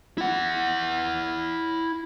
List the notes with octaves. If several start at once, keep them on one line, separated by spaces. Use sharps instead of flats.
E4 F#5